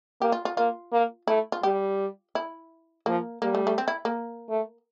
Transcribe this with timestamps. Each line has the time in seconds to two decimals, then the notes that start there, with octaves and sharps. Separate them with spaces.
0.21 A#3 G4
0.32 F4
0.45 F4
0.57 A#3 F4
0.92 A#3
1.28 A3 E4
1.52 F4
1.63 G3 G4
2.35 E4
3.06 F3 A#3
3.42 G3 A#3
3.55 A3
3.67 A3
3.78 C4
3.88 E4
4.05 A#3
4.49 A3